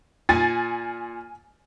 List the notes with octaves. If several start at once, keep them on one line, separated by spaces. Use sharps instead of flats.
A#2 G#5 A6